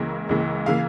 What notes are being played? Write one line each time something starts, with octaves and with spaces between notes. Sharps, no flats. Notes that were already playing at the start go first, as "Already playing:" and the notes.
Already playing: C#2 C#3 E3 A#3
C#2 C#3 E3 A#3
C#3 E3 A#3 F5